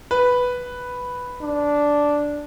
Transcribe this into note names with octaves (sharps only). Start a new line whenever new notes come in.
B4
D4